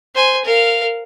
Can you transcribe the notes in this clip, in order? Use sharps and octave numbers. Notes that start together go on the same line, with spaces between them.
C5 G#5
A#4 F5